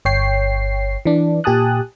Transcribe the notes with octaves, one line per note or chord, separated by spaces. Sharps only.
G1 C#5 G5 C7
E3 D4
A#2 G4 G#5 A5 D#6 F#6